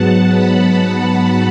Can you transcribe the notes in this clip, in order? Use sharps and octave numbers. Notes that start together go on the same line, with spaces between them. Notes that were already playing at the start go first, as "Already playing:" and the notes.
Already playing: G#2 F#3 B3 F#5 A5
B5